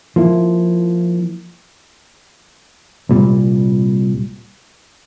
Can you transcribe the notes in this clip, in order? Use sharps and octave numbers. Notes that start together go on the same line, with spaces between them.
F3 A#3 E4
C2 A#2 G3